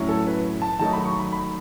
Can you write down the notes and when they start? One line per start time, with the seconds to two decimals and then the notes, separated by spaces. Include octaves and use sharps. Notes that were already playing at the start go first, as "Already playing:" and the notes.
Already playing: A2 F#3 C#4 E4
0.09 A4
0.27 B4
0.62 A5
0.79 D#3 F#3 A3 D#4 A5
0.93 B5
1.05 C#6
1.19 B5
1.32 B5